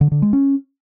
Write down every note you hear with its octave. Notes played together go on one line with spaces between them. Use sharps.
D3
D3
G#3
C#4